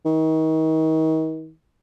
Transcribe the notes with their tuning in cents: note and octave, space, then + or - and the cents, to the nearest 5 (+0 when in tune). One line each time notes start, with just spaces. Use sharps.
D#3 +35